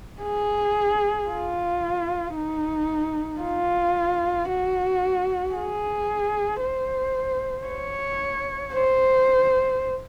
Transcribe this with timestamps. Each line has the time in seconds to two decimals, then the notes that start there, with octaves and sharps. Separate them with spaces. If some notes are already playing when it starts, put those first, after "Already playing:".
0.22 G#4
1.28 F4
2.35 D#4
3.41 F4
4.48 F#4
5.54 G#4
6.61 C5
7.67 C#5
8.73 C5